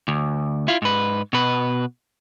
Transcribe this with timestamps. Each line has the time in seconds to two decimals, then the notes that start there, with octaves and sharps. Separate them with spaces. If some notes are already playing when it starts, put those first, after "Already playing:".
0.08 D2
0.68 E4 F4
0.82 G#2 B4
1.33 B2 B4